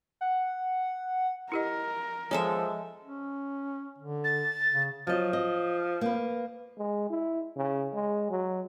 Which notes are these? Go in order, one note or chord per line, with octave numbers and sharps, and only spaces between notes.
F#5
E4 G4 A#4 D#5
F3 G#3 A4 C#5 E5
C#4
D3
A6
C#3
F3 F#3 D#5
D#5
A#3 B4
G#3
E4
C#3
G#3
F#3